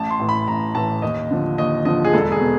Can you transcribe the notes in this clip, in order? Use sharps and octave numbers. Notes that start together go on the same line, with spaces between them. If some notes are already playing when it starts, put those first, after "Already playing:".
Already playing: A1 A5
C6
A2 E3
B5
A1 A#5
A2 E3 A5
D#2 D#5
D3 F3
D#2 D#5
D3 F3 D#5
G#4
E1 A4
G#4
B2